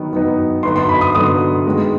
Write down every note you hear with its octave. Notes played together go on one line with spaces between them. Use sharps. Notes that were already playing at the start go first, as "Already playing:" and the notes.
Already playing: D#3 F#3 B3
D#3 F#3 B3 D#4
D3 F#3 B3 D#4 C6
C6
B5
D#6
D3 F#3 B3 D#4 D#6
D#3 G#3 B3